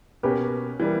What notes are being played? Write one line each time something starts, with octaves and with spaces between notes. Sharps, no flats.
B2 A#3 C#4 G4 B4
E3 G3 A#3